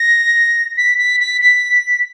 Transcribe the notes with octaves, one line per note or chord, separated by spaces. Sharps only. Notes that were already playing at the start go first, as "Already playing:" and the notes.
Already playing: A#6
B6
B6
B6
B6